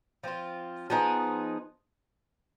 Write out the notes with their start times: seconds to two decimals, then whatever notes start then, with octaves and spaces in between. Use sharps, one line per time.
0.24 F3 C4 F4
0.90 F3 B3 D#4 G#4